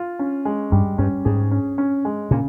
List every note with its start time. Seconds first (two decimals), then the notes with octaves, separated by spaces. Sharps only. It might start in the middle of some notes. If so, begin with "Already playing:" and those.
Already playing: F4
0.19 C#4
0.45 G#3
0.72 G2 G3
0.98 G2 C#4
1.25 G#2 G#4
1.51 C#4
1.78 C#4
2.05 G#3
2.31 A#2 C#3